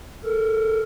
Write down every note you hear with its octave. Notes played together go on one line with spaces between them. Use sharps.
A4 A#4